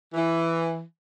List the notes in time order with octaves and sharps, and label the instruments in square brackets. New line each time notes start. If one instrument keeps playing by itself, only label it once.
[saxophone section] E3